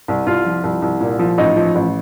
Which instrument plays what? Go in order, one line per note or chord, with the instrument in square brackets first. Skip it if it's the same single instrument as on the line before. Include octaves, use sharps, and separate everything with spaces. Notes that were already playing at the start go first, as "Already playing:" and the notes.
[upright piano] C2
C2 F4
F3
C2
C2
A#2
F3
A1 D#4
F3
A1